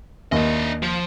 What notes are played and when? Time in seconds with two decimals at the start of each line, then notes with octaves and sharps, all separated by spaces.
0.32 D#2 D4 D#5
0.83 F3